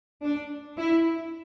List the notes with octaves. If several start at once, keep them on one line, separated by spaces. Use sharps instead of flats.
D4
E4